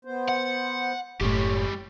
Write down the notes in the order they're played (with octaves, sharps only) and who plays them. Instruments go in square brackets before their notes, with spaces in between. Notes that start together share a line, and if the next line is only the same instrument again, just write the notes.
[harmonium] B3 C5
[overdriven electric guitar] F#5
[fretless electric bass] F#1 A2 [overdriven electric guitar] G#3 G4 [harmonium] C#5